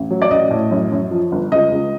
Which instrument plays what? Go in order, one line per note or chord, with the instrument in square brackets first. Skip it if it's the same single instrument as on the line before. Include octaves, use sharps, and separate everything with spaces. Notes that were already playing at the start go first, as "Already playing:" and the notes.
Already playing: [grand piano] A1
F#3
D5
A1 D#5
A2
F#2
F#2
F3
G1
C#2 D#5
C#2